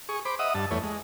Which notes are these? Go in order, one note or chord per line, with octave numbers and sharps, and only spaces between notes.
G#4 C#6
C5 B5 D6
D#5 E5 F#5 D#6
G2 A5
E2 A3 C#5
G#3